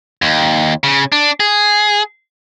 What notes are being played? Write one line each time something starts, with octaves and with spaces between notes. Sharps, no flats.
D#2
C#3
D4
G#4